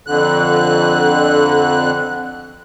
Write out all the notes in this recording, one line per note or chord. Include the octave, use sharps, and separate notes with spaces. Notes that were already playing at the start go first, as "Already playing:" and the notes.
F2 D3 F#6